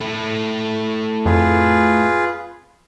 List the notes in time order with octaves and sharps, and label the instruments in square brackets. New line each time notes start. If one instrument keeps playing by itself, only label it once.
[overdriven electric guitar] A3 E4
[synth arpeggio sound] F2 [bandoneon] F4 G#4 B4